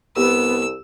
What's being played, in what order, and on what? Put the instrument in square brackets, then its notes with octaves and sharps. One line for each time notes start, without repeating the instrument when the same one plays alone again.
[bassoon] C2 [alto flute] B3 [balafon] G4 [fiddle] E6